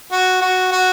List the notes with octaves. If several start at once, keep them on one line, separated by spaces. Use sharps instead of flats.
F#4
F#4
F#4